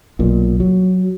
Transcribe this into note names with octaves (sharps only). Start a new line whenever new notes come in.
B1 A#2
F#3